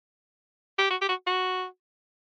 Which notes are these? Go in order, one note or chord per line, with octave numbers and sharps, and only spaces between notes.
G4
F#4
G4
F#4
F#4